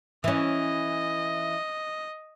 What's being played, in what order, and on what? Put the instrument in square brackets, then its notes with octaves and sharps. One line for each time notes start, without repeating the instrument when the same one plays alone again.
[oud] E3 C#4 [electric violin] D#5